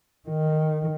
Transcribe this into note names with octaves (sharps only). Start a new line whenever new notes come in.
D#3